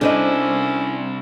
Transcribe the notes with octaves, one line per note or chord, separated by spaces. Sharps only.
C2 C#4 D4 E4 A4 C5 D#5